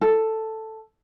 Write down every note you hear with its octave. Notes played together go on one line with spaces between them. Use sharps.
A4